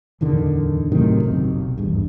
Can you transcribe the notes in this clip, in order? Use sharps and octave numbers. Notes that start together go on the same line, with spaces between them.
D1 E2 D3 D#3
A2 C3 D#3 F#3
F#1 B1
D#1 G#1 E2 G2